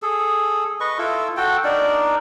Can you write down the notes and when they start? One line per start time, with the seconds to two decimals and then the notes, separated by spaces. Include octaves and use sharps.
0.02 G#4 A4
0.80 B4 D#5 C#6
0.98 E4 F4 A4
1.37 F#4 A4 G5
1.64 D4 D#4 A#4 D5